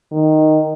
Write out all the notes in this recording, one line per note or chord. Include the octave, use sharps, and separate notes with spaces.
D#3